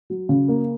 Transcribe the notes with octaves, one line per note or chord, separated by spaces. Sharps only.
F#3
C#3
A#3